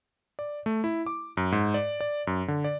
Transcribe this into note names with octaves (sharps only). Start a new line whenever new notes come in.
D5
A3
E4
D6
F#2
G#2
D5
D5
F#2
D3
D5